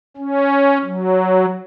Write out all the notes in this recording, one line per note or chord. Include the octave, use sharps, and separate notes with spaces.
C#4
F#3